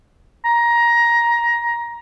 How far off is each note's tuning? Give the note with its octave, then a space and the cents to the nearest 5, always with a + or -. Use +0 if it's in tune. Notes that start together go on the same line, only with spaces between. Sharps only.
A#5 +15